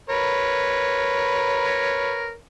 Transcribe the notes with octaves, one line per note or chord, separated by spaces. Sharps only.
A#4 B4 C#5